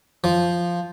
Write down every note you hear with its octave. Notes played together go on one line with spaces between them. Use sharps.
F3